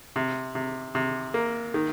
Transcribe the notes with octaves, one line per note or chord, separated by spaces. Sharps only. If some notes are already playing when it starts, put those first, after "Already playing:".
C3
C3
C3
A#3
D#3